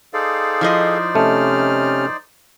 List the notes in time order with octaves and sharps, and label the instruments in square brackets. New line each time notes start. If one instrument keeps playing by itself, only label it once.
[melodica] D#4 C5 D5 [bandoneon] G#4 A4 F5
[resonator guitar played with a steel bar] F3 E4 D#5
[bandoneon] C3 C#4 F6 [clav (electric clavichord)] A3